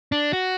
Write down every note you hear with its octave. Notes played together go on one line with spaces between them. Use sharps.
D4
F#4